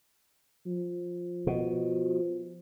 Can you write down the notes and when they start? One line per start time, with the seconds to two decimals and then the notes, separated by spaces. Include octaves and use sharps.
0.66 F3
1.47 B2